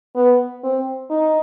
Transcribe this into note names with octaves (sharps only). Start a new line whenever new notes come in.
B3
C4
D#4